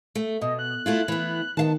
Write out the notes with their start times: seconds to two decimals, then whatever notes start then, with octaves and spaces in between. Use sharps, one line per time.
0.15 A3
0.42 B2 D#5
0.59 F#6
0.86 A3 E4 F4
1.08 E3 B3
1.57 D#3 B3 F5 A5